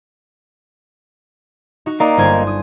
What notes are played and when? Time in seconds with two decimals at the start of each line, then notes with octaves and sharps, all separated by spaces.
1.86 D#4 F#4
2.00 A#3 D#4 D5
2.17 G1 C5 G#5
2.47 D#6